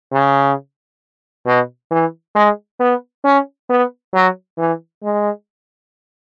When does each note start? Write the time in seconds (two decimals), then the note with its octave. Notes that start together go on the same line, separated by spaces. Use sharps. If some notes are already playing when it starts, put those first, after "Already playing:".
0.12 C#3
1.46 B2
1.91 E3
2.35 G#3
2.80 B3
3.24 C#4
3.70 B3
4.14 F#3
4.58 E3
5.03 G#3